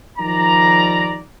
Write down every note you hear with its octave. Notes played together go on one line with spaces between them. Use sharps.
D#3 F3 G3 D5 A#5